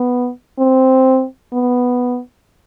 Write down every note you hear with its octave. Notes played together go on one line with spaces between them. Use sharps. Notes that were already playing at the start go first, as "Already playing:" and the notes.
Already playing: B3
C4
B3